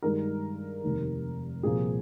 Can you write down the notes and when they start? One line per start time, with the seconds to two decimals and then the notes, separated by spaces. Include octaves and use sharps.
0.02 G2 D#3 G#3 D#4 A#4
0.83 F1 D#2 D#3
1.63 C2 A#2 F3 A#3 G#4